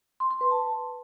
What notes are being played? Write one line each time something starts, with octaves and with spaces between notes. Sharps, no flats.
C6
C6
B4
A5